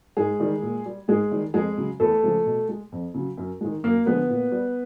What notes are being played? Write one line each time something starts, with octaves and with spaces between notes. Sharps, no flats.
G#2 G#3 G#4
D#3 G3
A#2
G3
G#2 G#3 G#4
D#3 G3
F2 G#3 G#4
C#3 F#3
E2 A3 A4
C#3 F3 G#3
B2
G#3
F2
C#3 F#3
F#2
D#3 G#3
F#2 A#3 A#4
D3 F3 G#3 B3 B4
A#2
G3